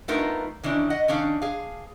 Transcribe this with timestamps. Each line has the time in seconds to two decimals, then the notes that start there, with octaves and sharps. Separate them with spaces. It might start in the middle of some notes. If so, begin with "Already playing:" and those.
0.08 A3 B3 D#4 F4 A#4
0.63 D#3 E3 C#4 D4
0.90 D#5 F#5
1.08 D#3 C#4 D4 F5
1.42 G#4 F5